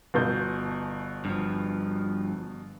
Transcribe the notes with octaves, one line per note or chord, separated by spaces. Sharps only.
G1 B2 G6
G2 F3